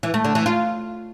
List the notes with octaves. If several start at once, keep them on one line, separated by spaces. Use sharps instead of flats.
E3
A3
D3
E3
F4